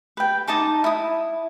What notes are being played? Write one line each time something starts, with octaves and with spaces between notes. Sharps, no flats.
B4 G5
D#4 D#5 A5 D6
E4 D#6